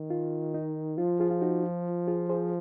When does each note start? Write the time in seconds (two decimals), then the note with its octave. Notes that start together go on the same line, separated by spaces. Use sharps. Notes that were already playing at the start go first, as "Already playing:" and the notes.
Already playing: D#3
0.10 F4
0.54 D#4
0.98 F3 F4
1.20 F4 G#4
1.31 F4
1.42 D#4 F#4
1.64 F4
2.07 F4 G#4
2.29 G#4 C5